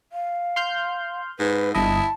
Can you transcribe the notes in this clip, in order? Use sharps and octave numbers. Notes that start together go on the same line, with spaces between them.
F5
C6 F6 G6
G#2 B4
G1 E4 D#5 A5